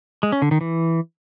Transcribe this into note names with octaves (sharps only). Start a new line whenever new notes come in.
G#3
C#4
D3
D#3
E3